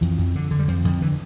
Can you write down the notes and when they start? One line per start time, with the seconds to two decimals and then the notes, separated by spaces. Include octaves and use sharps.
0.01 F2 E3
0.18 F2
0.36 D3
0.51 D3
0.59 G3
0.68 F2 F3
0.85 F2 D3
1.01 D3 E3